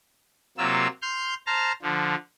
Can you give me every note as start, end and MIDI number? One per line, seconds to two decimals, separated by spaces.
0.58 0.87 48
0.58 0.87 54
0.58 0.87 58
0.58 0.87 65
0.58 0.87 88
1.02 1.34 84
1.02 1.34 89
1.02 1.34 91
1.47 1.72 72
1.47 1.72 81
1.47 1.72 82
1.47 1.72 89
1.82 2.15 50
1.82 2.15 53